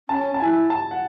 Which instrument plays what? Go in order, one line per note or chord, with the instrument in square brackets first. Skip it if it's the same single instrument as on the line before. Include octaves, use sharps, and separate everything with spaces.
[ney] C#4 [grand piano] A5
[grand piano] A5
[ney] E4 [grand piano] G#5
[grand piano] A5
F#5